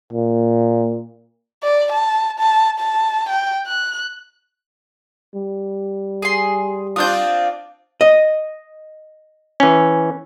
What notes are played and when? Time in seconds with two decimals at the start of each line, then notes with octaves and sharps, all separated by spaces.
0.13 A#2
1.63 D5
1.92 A5
2.39 A5
2.79 A5
3.29 G5
3.66 F#6
5.35 G3
6.22 G#4 C6
6.96 C4 D4 F4 D#6 G6
8.01 D#5
9.60 E3 C#4